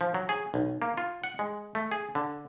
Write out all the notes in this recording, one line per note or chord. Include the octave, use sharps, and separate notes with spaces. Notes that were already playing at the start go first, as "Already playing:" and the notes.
F3
F#3
G#4
B1
A#3
F4
F#5
G#3
A3
G#4
D3